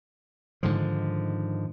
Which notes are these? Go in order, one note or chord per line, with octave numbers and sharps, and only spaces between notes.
G#2 D3 D#3 F3